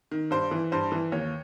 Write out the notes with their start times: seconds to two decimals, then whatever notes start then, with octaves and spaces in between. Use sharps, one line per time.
0.11 D#3
0.31 G2 C5
0.51 E3
0.72 G2 C5
0.92 E3
1.12 D#2 C#5